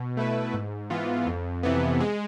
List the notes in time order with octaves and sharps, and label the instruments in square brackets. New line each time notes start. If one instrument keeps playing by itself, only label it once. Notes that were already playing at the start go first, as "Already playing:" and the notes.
Already playing: [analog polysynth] B2
A3 E4 B4
G#2
E3 B3 F4
F2
C3 E3 B3
G#3